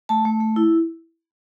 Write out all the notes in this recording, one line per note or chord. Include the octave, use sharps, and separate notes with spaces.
A3 A5
A3
A3
E4